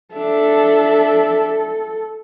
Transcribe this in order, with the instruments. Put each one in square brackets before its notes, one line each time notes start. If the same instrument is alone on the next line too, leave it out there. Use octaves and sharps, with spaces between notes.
[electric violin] D4 E5 [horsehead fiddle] A4